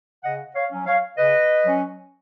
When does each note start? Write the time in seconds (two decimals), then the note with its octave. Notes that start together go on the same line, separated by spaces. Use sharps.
0.24 C#3 D#5 F#5
0.55 C#5 F5
0.71 F#3 C#4
0.87 C#5 F5
1.18 C#3 B4 D#5
1.65 F#3 C#4